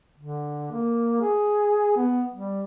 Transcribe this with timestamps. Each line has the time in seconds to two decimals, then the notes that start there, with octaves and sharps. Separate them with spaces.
0.18 D3
0.71 A#3
1.22 G#4
1.96 B3
2.33 G3